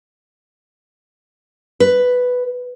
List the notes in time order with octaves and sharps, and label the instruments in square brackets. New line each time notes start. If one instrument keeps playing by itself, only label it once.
[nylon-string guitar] B4